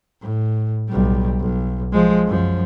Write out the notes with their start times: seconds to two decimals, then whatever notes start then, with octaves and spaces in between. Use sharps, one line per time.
0.21 A2
0.88 B1 G3
1.40 B1
1.92 F3 G#3
2.26 F#2 F3